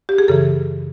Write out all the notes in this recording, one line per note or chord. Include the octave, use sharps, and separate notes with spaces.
G4
G#4
F#2 C#3 E3 A4